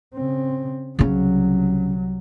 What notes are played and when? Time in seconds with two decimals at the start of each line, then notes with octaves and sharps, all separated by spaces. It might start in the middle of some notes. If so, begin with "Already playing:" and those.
0.14 C#3 C4
0.99 C2 C#3 F#3 C#4